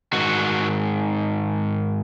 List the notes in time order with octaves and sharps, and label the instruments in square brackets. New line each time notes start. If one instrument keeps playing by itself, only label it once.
[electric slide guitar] G#2 D#3 F#4